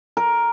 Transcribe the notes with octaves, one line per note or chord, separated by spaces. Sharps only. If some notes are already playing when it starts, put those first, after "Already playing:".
A#4